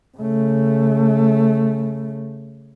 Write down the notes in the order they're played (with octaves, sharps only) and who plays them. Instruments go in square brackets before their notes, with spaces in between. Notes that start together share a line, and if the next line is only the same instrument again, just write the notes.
[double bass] C#3 A3